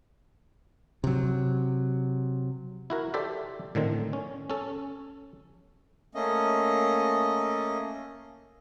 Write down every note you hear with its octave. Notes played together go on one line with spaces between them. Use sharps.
C3 F#3
E4 F#4 A#4
G4 A4 C5 D5 E5
A2 D3 D#3 C4
C#4
C#4 A4
A3 A#3 C#4 D#5